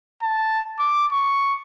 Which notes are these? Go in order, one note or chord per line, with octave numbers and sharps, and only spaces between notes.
A5
D6
C#6